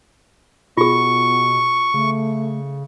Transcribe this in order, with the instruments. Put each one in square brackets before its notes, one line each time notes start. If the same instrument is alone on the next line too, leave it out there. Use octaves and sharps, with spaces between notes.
[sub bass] B2 [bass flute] B3 [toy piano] F4 G#4 [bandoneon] C#6
[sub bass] C#3 [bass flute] A3